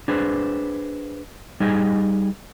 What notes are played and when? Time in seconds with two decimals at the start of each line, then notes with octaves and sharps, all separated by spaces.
0.08 D4 G#4 B4 C5
1.60 G3 D#4 G#4 D#5 G#5